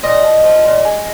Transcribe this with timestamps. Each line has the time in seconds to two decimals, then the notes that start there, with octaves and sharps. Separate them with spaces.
0.03 A#2 D#5
0.23 F3
0.44 F3
0.64 A#2
0.85 G#3